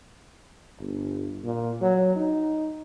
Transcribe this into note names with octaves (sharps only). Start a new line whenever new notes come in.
G1
A#2
F#3
D#4